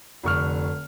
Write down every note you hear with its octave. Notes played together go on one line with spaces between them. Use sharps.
F1 D3 C#6 F6